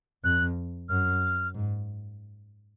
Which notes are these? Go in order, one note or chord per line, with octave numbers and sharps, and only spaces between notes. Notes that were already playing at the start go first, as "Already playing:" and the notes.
F2 F#6
F#2 F6
G#2